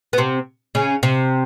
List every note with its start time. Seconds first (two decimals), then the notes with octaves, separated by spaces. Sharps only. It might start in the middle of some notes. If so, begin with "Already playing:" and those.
0.13 B3
0.18 C3 C4
0.75 C#3 C#4
1.03 C3 C4